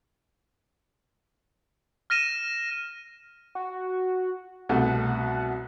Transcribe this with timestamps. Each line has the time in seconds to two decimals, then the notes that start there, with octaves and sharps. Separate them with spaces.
2.10 F6 A#6 D#7 E7
3.55 F#4
4.69 C2 B2 A3 F#5